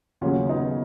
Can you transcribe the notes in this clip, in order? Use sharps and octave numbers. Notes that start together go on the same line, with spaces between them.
D#2 C#3 F#3 C#4 F4
B3 D#4